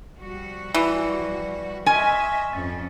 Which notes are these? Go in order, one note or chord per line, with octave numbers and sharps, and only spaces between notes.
F3 G3 F#4
E3 D5 B5
D#5 E5 G#5 C6 C#6 F6
F2 C#4 A6